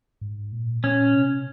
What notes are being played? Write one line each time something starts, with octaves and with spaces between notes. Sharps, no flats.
G#2
A#2
A#2 C#4
C3